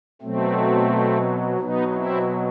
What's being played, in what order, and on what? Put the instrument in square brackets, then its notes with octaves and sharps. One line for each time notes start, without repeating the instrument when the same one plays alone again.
[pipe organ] B2 F#3 A3 C4
B2 F#3 B3 D#4
C4 E4